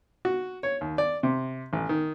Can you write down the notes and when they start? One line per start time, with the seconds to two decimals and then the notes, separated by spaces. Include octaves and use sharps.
0.25 F#4
0.63 C#5
0.81 D#2
0.98 D5
1.23 C3
1.73 A1
1.89 D#3